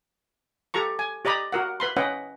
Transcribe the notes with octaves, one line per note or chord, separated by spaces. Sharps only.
G4 A4 A#5 C#6
G#5
G4 D5 D#5 A#5 B5
F#4 A#4 F#5
B4 B5 C6
C#4 B4 D#5 F#5 G5